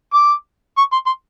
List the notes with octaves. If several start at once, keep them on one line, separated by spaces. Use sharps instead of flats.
D6
C#6
C6
C6